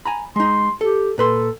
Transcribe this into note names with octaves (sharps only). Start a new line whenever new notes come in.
G#5 A#5 B5
G#3 D#4 C6
G4 A4
A#2 A4 B4 C6